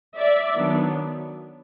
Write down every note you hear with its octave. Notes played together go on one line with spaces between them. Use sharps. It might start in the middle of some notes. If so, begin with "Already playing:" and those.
D5 E5
D#3 F#3 B3 D4